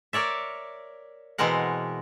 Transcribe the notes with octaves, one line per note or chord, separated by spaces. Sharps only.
A#4 C#5 D5 E5
B2 E3 G#3 C4 A#4 F#5